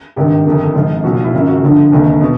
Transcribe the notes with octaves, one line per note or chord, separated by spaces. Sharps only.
G#1 G2 D#3 G4
G1 F2 C3 D#3
G#1 G#2 F3 F4
B1 A#2 F3 F#4
F4
E4
G#1 F#2 C#3 F4
F#4
G1 G2 D3 F3
F1 D#2 D3
B2